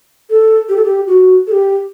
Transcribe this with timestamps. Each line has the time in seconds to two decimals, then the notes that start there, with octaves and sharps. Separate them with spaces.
0.30 A4
0.69 G4
0.76 A4
0.84 G4
1.07 F#4
1.47 A4
1.52 G4